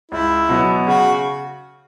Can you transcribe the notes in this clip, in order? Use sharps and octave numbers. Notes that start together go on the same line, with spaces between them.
C#2 E4
B2 F#3 B3
C#3 F#4